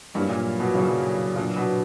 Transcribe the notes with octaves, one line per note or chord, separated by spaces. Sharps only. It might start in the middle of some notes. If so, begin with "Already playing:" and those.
G2 F#3 A#3 C#4 E4
A#2
B2
C#3 F#3 A#3 C#4 E4
A#2 F#3 B3 D4
B2